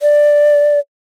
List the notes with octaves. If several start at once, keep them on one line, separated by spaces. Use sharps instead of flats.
D5